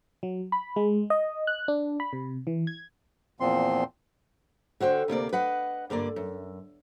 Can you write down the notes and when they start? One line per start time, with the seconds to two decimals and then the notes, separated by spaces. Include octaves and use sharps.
0.23 F#3
0.52 B5
0.76 G#3
1.10 D#5
1.47 F#6
1.68 D4
2.00 B5
2.13 C3
2.47 E3
2.67 G#6
3.40 E2 A#2 F3 C4 C6
4.80 D3 F#4 C5 G5
5.08 D2 C3 A#3 D5
5.33 B4 D#5 F#5
5.90 G2 D3 A#3 D5
6.16 F#2